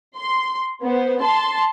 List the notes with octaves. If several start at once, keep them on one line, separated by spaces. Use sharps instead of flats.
C6
B3 C5
A5 C6